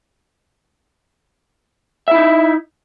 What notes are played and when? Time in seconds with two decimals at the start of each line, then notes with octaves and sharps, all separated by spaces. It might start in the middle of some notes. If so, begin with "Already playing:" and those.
2.08 E5
2.11 E4
2.15 D#4